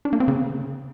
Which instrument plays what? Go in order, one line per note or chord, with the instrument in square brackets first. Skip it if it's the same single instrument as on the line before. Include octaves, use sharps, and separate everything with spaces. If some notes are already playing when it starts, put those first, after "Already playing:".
[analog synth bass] D4
A#3
C4
C#3